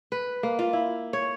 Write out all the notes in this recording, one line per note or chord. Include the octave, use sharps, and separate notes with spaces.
B4
A#3
F4
E4
C#5